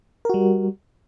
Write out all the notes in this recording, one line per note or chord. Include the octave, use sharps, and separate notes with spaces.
G3 F#4 A#4